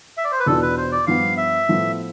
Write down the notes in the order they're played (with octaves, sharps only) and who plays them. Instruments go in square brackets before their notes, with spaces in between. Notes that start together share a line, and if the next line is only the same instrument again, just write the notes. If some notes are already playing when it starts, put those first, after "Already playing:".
[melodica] E5
D5
C5
B4
[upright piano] E2 B2 B3 D4 F4 [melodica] A4
[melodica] B4
C5
D5
[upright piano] G2 F3 B3 [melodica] F5
[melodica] E5
[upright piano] A2 F3 B3